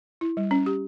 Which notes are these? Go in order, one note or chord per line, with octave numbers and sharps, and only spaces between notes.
E4
G3
C#4
G4